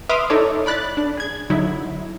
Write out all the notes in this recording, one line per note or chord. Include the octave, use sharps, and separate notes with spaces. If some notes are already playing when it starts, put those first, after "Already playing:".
B4 E5 C6 D6 D#6 F6
D#4 E4 A4 C#5 D5
D5 B5 F#6 A6
D4
G#4 G#6
D3 F#3 D#4 E4